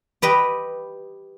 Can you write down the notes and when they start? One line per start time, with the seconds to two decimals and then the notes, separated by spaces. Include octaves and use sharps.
0.22 G4 B4 D#5